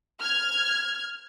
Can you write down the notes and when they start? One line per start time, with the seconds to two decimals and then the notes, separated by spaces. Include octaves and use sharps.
0.20 F6 G#6